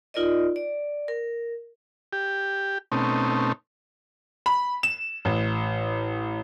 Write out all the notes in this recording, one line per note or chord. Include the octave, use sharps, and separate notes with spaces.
D#4 F4 A#4 D5 D#5
D5
A#4
G4
B2 A3 C4 C#4 D#4
B5
E7
A1